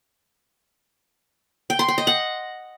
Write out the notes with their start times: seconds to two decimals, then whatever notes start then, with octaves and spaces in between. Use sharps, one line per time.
1.70 G5
1.79 C6
1.88 G5
1.98 D#5
2.07 F#5